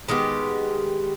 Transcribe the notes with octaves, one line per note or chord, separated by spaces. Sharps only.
D#3 G#3 B3 G4